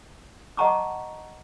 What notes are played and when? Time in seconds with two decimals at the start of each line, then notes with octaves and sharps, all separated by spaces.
0.57 D#5 F#5 A5 A#5 C#6 D6